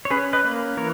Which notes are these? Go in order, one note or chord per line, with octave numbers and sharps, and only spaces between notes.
C#5
C#4 G#4 B4
B4 D#5
A#3
E3 A#4 C#5